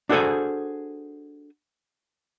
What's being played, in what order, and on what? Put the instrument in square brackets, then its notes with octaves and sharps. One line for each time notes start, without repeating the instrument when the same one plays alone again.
[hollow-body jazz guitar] D4 F#4 G#4 A4 C5 G#5